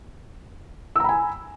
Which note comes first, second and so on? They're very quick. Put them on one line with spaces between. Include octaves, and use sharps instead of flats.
E6 A#5 B5 G#5